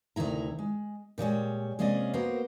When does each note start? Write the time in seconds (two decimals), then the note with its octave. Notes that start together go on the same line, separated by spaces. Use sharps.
0.16 D2 C3 D#3 E4 A#5
0.59 G#3
1.18 A#2 G3 G#3 C#5
1.79 C3 G#3 A#3 C#4 D5 D#5
2.13 A#3 B3 F#4 A#4 C5